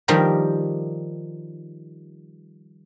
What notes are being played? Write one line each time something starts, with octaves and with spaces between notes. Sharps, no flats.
D#3 F3 G3 F4 G4 A#4